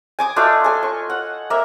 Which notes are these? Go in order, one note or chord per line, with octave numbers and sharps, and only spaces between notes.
G#5 D6 D#6
A3 D4 F4 D#5
A4 G#5
C#6
F#5
A#3 E5